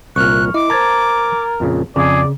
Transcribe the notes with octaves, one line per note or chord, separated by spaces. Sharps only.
C2 A#2 C#6 F6 F#6
E4 D#5 D6
A#4 C5 A5 A#5 G#6 A6
F2 A#2 C#3
F2 C#3 G#4 D5